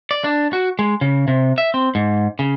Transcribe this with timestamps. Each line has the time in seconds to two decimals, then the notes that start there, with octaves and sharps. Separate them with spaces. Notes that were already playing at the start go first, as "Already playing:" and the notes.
0.11 D5
0.24 D4
0.53 F#4
0.79 G#3
1.01 C#3
1.28 C3
1.58 E5
1.74 C4
1.95 G#2
2.39 C#3